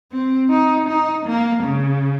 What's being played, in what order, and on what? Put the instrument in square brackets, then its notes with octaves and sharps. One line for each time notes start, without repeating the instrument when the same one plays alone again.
[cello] C4
D#4
D#4
A#3
C#3